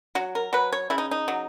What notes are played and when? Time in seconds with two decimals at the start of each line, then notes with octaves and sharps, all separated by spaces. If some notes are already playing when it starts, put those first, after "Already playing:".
0.15 F#3 F#4
0.35 A#4
0.53 F#3 B4
0.72 C#5
0.90 C#3 E4
0.98 D#4
1.11 D#4
1.28 F#3